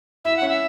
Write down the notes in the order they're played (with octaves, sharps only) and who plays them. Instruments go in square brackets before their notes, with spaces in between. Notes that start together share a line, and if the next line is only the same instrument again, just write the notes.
[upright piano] E4 [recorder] E5
[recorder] F#5
[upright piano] C#4
[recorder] E5